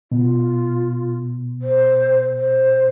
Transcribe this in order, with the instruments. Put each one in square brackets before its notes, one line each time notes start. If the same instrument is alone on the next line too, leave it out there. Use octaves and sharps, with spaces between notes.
[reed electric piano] B2 [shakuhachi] F4
[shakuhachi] C5
C5